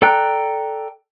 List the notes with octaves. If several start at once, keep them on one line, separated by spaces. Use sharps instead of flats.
A4 D5 G5 A#5 F#6